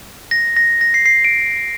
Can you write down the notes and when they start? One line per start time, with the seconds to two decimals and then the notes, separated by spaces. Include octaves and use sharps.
0.31 A#6
0.56 A#6
0.81 A#6
0.94 C7
1.06 C7
1.24 D7